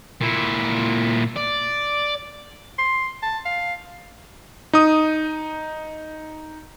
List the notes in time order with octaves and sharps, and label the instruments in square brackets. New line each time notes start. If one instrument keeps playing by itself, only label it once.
[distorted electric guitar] A#2 E4
D5
[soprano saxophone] C6
A5
F5
[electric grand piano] D#4 D#6